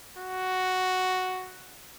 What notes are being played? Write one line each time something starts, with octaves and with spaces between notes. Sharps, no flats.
F#4